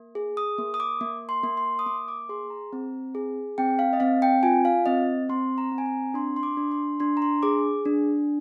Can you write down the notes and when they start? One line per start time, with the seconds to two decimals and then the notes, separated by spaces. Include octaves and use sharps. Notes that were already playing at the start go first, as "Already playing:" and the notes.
Already playing: A#3
0.15 G#4
0.37 D#6
0.58 A#3
0.74 D#6
0.80 D6
1.01 A#3
1.29 C6
1.43 A#3
1.57 C6
1.79 D#6
1.86 A#3 D6
2.08 D6
2.29 G#4 C6
2.50 A#5
2.73 C4
3.15 G#4
3.58 C4 G5
3.79 F5
3.93 D#5
4.00 C4 F5
4.22 G5
4.43 F4 G#5
4.65 F5
4.86 C4 D#5
5.29 C4 C6
5.58 A#5
5.72 C4
5.78 G#5
5.86 A#5
6.14 D4 C6
6.36 C6
6.43 D6
6.57 D4
6.72 C6
7.00 D4 C6
7.17 A#5
7.22 C6
7.43 G#4 D6
7.85 D4